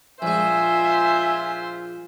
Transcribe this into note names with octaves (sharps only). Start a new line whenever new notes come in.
A#1 G#3 F4 C5 E5 G#5